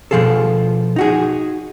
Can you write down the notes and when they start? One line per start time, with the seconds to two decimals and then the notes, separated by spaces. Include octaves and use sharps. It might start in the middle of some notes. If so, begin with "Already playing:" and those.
0.11 B2 E3 F3 F4 G#4 A4
0.96 D#4 F#4 G#4